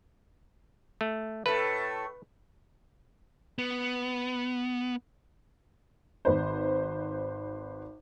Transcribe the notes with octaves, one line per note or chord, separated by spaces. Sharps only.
A3
A2 A3 B4
B3
G#1 B4 C5